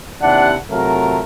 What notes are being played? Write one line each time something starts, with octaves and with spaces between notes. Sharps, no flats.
D#2 C3 D4 E4 F#5
C3 F#3 A3 F4 A#4